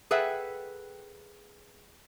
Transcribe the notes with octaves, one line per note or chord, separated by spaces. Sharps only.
G#4 A4 B4 E5 F#5 G5